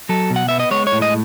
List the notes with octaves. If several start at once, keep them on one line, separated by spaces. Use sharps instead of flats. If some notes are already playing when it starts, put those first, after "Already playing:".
F#3 A4
B2
F#5
B3 E5
D#5
G#3 C#5
C#5
A2
D#5